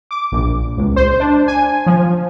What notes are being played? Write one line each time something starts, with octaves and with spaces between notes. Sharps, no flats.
D6
A#1
C#2
C5
D4
G#5
F3